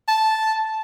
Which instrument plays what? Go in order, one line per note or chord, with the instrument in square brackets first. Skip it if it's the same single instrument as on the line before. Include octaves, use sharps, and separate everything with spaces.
[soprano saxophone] A5